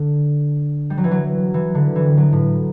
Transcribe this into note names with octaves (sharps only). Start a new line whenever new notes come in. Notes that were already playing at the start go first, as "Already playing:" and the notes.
Already playing: D3
G3
F#3
E3
F#3
E3
D3
E3
F#3
A2